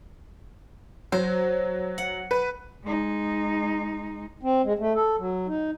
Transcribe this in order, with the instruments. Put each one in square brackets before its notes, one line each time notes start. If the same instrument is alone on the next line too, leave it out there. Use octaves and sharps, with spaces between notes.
[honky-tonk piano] F#3 [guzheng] C5
[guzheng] F#5
[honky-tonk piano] B4
[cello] G#3 D#4
[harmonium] C4
G#3
A3
A4
F#3
D#4